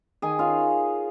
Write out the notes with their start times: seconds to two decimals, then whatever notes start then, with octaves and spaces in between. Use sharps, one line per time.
0.22 D#3 G#4 G#5
0.39 C#4 F4 F5